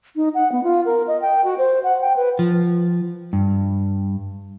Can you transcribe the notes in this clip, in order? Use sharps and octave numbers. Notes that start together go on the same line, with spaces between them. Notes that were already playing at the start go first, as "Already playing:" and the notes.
D#4
F#5
B3
F4
A#4
D#5
G5
F#4
C5
F#5
G5
B4
F3
G2